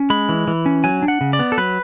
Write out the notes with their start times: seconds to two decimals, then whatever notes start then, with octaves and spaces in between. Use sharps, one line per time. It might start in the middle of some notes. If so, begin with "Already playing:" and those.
Already playing: C#4
0.10 G#3 B5
0.29 E3
0.48 E3
0.66 C#4
0.84 F#3 G#5
1.02 D4
1.08 F#5
1.21 C#3
1.33 D5
1.39 B3
1.52 A4
1.58 F#3 B4